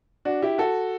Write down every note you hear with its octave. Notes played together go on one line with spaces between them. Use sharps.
D4 F#4
E4 G4
F#4 A4